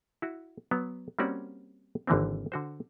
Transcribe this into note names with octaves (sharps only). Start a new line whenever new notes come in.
E4 F#4
F#3 B3
G3 A#3 C4 C#4 F#4 D5
G#1 D3 E3 A#3 C4
D3 F#4 C5